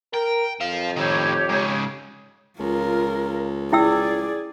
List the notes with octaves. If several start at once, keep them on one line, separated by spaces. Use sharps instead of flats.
A#4 G5
F2 C5 F5
A2 D#3 G4 C#5
G#2 C#3
C#2 F4 A#4
E4 G#4 D5 G5 E6